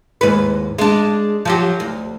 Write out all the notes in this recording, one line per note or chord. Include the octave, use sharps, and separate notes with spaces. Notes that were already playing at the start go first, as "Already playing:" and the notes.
D#2 G#2 B4
G#3 D4
F3 F#3 G4
D2